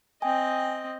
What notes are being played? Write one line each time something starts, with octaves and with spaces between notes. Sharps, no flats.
C4 D#5 G5 G#5